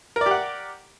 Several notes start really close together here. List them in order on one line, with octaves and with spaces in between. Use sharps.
A#4 D5 G4 F#5